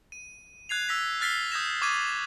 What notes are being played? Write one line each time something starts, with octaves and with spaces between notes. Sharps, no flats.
D#7
F#6 G#6 C7 F7
E6 A#6 B6 F7
E6 F6 A6 B6 C7 G7
D#6 G6 G#6 A#6 E7
C#6 D6 F6 G#6 D#7